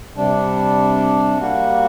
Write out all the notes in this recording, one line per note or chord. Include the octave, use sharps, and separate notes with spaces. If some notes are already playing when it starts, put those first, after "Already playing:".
C3 G3 D4
G3 A#3 F#4